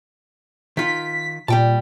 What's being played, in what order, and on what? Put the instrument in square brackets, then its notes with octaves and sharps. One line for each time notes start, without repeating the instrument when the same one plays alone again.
[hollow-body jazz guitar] D#3 F4 [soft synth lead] B6
[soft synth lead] A#2 [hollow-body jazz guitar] G3 G5 A5